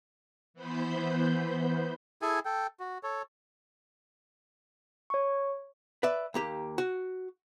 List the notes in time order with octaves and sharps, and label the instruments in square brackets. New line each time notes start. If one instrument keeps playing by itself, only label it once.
[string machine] E3 B3 C5 B5 G6
[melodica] E4 G#4 A4 G#5
A4 G5
F#4
A4 C#5
[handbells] C#5 C#6
[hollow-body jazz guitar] B4 D5 E5
D#2 A#3 G4
F#4